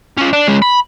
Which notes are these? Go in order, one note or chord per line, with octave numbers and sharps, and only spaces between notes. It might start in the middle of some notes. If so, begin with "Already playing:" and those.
C#4 F4
D4
G#3 C#4
B5